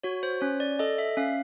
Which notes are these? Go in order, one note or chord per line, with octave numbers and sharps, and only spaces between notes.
F#4 C#5
C5
C#4 C#5
D5
A4 D#5
E5
C#4 F5